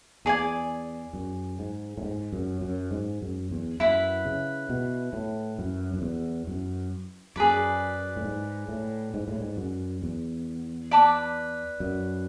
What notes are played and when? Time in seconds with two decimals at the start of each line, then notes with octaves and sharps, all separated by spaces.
0.25 E2 G#4 D5 G#5
1.13 F#2
1.59 G#2
1.98 A2
2.03 G#2
2.32 F#2
2.61 F#2
2.91 G#2
3.22 F#2
3.51 E2
3.80 F#2 E4 B4 F#5
4.25 C#3
4.70 B2
5.13 A2
5.59 F#2
5.94 F#2
6.02 E2
6.47 F#2
7.36 F#2 G#4 B4 D5
8.16 A2
8.25 G#2
8.69 A2
9.14 G#2
9.28 A2
9.41 G#2
9.57 F#2
10.03 E2
10.91 B4 D5 A5 D6
11.80 F#2